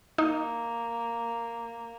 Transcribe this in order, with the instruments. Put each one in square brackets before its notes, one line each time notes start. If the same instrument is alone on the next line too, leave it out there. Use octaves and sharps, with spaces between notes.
[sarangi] A#3 [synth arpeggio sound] D#4